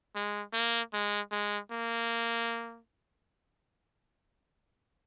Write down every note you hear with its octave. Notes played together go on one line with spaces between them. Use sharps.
G#3
A#3
G#3
G#3
A#3